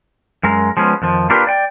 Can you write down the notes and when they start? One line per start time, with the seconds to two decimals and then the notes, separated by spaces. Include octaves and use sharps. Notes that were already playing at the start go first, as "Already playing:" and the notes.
0.43 F#2 G#3 A#4
0.77 F3 G#3 B3 C#4
1.02 F2 D#3 F3
1.30 A#3 D4 F4 G4 A#4 B4
1.47 D5 G5